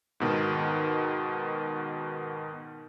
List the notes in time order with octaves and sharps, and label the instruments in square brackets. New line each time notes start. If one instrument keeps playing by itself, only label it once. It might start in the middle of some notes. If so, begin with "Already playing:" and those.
[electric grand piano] G#2 B2 D#3